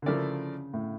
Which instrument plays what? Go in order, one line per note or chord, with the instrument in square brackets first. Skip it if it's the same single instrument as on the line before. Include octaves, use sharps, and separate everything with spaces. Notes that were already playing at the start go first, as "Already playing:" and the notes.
[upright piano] D3
[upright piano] C#3 [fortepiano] F3 A3 E4 A#4 D5
[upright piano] A2